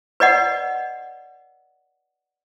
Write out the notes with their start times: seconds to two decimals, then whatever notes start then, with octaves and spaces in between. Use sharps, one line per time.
0.20 B4 D5 D#5 F#5